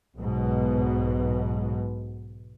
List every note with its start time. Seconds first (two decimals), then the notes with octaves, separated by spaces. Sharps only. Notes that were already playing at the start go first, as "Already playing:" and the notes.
0.15 B1 G#2 B2